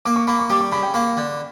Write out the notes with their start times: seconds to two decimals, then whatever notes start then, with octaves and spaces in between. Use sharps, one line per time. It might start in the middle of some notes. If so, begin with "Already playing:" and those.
0.05 A#3 D6
0.16 C#6
0.27 A#3 B5
0.39 C#6
0.50 G3 D6
0.61 C#6
0.72 C#3 B5
0.83 G5
0.94 A#3 B5
1.17 D3